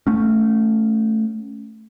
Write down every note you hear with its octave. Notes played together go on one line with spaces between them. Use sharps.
A3 C#4